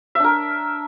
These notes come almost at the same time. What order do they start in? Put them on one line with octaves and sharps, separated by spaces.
E5 D4 A#4